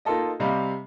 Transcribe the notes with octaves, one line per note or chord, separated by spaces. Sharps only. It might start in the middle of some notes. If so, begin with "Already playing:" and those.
A#3 D#4 F4 A4 D#5
C3 G3 D#5 F5